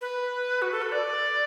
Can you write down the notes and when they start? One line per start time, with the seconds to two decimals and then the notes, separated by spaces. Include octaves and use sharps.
0.01 B4
0.62 F#4
0.72 A4
0.82 B4
0.92 D5